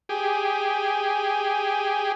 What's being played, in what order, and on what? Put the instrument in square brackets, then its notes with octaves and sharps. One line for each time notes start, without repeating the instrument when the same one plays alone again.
[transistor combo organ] G4 G#4